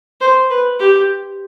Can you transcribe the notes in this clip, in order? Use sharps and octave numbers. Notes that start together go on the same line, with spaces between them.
C5
B4
G4